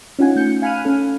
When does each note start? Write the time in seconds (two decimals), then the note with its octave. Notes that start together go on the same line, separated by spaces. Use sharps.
0.19 C#4 D#4 F4 F#5 G#5
0.36 A3 G6 C#7
0.62 F5 G#5 B5 F6 F#6 D#7
0.85 C#4 A4